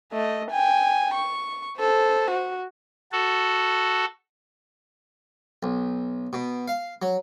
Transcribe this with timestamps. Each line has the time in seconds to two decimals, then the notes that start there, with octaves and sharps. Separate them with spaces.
0.13 A3 D#5
0.51 G5 G#5
1.15 C#6
1.78 A4 C5
2.31 F#4
3.12 F#4 A4
5.63 B1
6.33 B2
6.68 F5
7.02 F#3